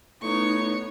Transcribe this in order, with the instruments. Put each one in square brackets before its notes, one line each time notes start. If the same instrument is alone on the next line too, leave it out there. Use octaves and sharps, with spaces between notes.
[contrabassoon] A2 [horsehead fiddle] B3 D#4 [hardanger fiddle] C#5 C#6